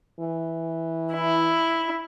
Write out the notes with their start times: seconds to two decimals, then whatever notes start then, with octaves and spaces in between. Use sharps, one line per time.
0.20 E3
1.13 E4